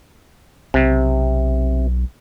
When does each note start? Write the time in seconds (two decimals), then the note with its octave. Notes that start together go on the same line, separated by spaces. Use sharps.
0.74 B1 C3